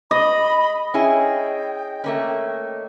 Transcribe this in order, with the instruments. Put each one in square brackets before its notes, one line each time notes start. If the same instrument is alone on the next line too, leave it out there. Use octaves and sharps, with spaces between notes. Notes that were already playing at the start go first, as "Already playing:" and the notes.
[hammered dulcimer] D#5 [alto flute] B5
[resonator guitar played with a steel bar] C#4 E4 G#4 [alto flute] G5
[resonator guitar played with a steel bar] A3 A#3 C#4